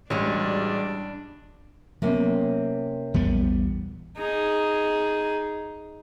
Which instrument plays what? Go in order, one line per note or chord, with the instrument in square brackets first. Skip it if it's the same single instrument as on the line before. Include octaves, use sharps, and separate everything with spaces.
[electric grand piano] A1 [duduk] G3 [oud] G#3 F#4 C#5 [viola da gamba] D4
[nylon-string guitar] C3 A#3 C#4 [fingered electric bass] F#3 B3
[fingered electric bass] A#1 [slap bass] E2 G3 B3
[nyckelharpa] D#4 G#4